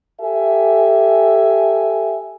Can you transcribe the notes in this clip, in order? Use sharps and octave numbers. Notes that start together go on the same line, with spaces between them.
G4 A4 E5 G#5